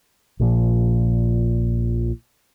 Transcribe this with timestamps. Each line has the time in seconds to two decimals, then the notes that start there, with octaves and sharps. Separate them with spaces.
0.40 A#1 A#2 F3